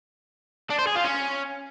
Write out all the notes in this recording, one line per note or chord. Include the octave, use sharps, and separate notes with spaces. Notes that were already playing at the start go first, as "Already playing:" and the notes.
D4
C5
G#4
F4
C#4